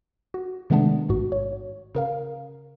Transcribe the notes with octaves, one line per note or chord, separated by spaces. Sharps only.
F#4
C3 D#3 G#3 A3 B3 D4
A1 G#2 F#4
C#5
C#3 A#4 F5